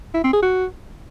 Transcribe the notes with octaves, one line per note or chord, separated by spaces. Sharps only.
E4
C4
G#4
F#4